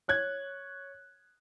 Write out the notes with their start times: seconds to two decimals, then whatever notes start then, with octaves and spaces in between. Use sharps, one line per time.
0.08 C#5 F#6 G#6